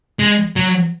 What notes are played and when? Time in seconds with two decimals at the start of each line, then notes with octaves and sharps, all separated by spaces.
0.19 G#3
0.56 F#3